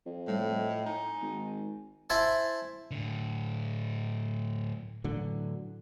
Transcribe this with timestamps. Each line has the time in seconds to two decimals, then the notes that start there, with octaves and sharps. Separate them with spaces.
0.06 F2
0.28 A2 G3
0.52 D#5
0.86 D#4 G#5
1.22 G#1
2.10 E4 C5 E5 G#5 A5
2.91 A2 D3
5.04 A2 D3 E3 F#3